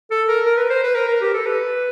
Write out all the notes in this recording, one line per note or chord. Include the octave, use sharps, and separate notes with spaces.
A4
A#4
A#4
B4
C5
B4
A#4
A#4
G4
A4
B4